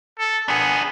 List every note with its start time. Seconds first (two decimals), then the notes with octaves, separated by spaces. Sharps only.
0.19 A4
0.48 B3 D4 G#4